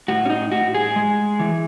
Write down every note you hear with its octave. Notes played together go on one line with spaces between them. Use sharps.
A2 F#4
C#4
D#4
A2 F#4
G#4
G#3
E3